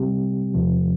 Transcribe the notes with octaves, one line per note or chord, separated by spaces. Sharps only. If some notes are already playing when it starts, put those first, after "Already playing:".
Already playing: C3 G3 C4 G4
E2 C3 F3